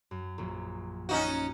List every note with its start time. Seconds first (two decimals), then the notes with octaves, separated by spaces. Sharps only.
0.11 F#2
0.38 A#1 F#2
1.09 C#4 D#4 F#4